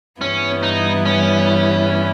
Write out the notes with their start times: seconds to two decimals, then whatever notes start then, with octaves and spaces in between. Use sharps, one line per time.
0.21 G2 E3 G3 B3 C#4 E4
0.63 D#4
1.05 C#4